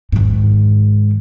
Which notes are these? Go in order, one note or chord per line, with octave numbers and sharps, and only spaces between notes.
G#2 D#3